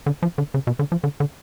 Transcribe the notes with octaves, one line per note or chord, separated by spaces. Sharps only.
D3
F3
D3
C#3
B2
D3
F3
D3
D3